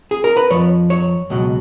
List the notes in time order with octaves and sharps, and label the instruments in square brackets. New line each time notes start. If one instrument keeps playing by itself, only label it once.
[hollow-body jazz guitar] G#4
A#4
B4
F2 F3 C#5
C#5
C#2 B2 F#3